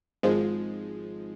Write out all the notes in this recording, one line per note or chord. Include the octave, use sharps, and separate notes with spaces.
G#1 G#2 F3 G#3